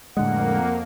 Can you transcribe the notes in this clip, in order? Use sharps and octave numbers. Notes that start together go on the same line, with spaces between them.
F2 A2 D3 G#3 A#3 F#5